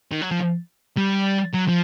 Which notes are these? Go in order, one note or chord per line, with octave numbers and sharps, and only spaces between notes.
D#3
F#3
F3
G3
F#3
F3